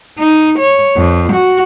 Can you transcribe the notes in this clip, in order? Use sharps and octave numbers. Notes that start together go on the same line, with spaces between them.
D#4
C#5
F2
F#4